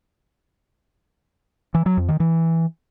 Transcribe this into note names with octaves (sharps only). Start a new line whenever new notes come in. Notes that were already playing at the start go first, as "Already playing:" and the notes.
E3
F#3
F2
D#3
E3